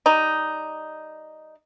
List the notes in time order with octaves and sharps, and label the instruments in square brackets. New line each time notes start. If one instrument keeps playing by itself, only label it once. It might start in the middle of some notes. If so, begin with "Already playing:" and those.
[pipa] G3 D#4